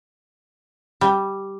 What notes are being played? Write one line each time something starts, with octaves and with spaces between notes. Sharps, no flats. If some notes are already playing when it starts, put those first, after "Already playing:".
G3